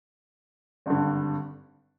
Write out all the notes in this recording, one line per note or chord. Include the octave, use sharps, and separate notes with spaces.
G#1 G2 D3